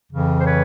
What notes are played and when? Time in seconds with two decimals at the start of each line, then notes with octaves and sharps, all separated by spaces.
0.10 F2 C#3 E3
0.41 C5
0.46 B4 C#5